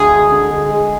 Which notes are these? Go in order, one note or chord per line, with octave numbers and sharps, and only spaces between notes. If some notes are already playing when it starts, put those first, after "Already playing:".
Already playing: D2 D3 G#3 G#4
G#3
D3
G#3
G#3